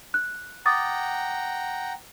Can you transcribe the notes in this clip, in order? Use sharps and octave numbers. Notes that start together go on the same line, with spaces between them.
F#6
F#5 G5 A#5 D6 D#6 A6